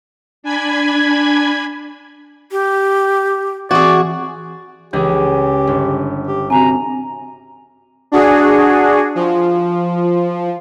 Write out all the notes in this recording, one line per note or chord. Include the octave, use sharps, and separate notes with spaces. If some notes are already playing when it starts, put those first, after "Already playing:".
D4 G#5 B5 G#6
G4
E3 C4 F#4 G#4 D5
C#2 E3 G4 G#4
G1
G4
C3 C4 F#4 G#5 A#5
D4 F#4 G#4
F3